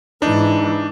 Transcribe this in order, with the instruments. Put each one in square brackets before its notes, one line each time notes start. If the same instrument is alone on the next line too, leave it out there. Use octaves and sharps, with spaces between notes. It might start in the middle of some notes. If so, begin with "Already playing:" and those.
[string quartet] G#2 E3 [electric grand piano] D4 D#4